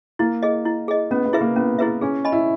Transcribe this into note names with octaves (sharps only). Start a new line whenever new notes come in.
A#3 E4
G#4 D#5
E4
G#4 D#5
B3 C#4
B3
E4 G#4 B4 E5
A#3
B3 C#4
E4 G#4 B4 E5
C#4 G#4
D#5 G#5 B5
E4